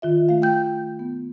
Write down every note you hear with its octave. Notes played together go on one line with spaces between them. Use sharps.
D#3 F4 E5
A3 F5
G5 G6
B3